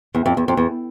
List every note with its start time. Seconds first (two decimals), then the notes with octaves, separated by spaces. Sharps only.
0.15 E2
0.26 F2
0.37 E2
0.48 F2
0.57 E2